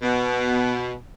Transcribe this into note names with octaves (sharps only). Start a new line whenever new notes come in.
B2